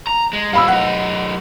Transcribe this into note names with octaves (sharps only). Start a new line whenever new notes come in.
A#5
G#3
A#2 G3 F5 B5 E6
F#2 D#4 F#5